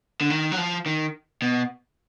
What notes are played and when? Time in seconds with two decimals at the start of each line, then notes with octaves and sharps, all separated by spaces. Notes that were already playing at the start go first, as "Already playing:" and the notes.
0.21 D3
0.30 D#3
0.52 F#3
0.57 F3
0.86 D#3
1.42 B2